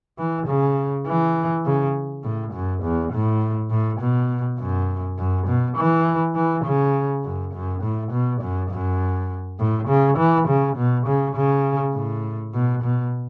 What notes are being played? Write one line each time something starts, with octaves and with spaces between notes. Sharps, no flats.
E3
C#3
E3
C#3
A2
F#2
E2
A2
A2
B2
F#2
F#2
B2
E3
E3
C#3
F#2
F#2
A2
B2
F#2
F#2
A2
C#3
E3
C#3
B2
C#3
C#3
A2
B2
B2